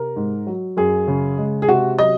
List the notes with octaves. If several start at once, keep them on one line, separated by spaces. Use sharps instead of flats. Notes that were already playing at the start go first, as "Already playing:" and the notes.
Already playing: C3 A#4
G#2
F#3
F#2 G#4
C#3
G#3
G#4
C3 F#4
F#3 D#5